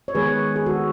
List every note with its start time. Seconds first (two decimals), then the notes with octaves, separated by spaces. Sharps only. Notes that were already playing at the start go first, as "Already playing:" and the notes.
0.08 C#5
0.15 D#3 G#3 B3 G#4 B4
0.56 G#4
0.66 D#3 G#3 B3 F#4 A4